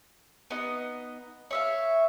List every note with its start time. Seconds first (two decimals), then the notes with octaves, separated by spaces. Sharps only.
0.51 B3 D#4 D#5
1.51 C#5 E5 F5